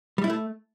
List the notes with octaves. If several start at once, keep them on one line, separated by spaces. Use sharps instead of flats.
G3
E4
A3